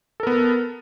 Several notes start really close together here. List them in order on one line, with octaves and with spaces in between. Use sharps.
A4 A#4 B3